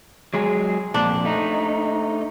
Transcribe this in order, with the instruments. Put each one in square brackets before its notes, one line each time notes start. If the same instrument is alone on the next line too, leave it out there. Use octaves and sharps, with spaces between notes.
[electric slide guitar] F#3 G#3 G#4
[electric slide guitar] F2 A#2 [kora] D4
[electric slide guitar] A3 D#4